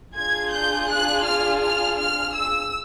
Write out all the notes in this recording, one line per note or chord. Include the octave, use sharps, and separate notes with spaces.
D4 F4 G#4 G#6
G6
F#6
F6
F6
F6
E6